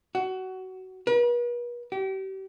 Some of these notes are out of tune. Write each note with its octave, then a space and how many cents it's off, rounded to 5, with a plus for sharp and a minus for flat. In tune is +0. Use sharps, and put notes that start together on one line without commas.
F#4 +20
B4 -45
G4 -35